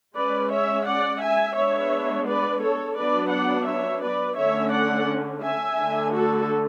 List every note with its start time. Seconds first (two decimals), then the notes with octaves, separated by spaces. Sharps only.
0.17 G#3 C#4 B4 D5
0.52 C#5 E5
0.87 D5 F#5
1.22 E5 G#5
1.57 G#3 B3 D4 C#5 E5
2.28 B4 D5
2.63 A4 C#5
2.97 F#3 B3 D4 B4 D5
3.32 D5 F#5
3.67 C#5 E5
4.03 B4 D5
4.37 D3 A3 C#4 C#5 E5
4.73 D5 F#5
5.42 E5 G#5
5.78 D3 A3 D4
6.13 F#4 A4